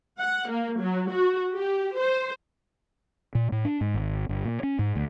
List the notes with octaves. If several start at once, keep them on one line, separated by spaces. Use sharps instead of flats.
F#5
A#3
F#3
F#4
G4
C5
A#2
A2
D4
G#2
G#1
G1
A#2
C#4
G#2
D2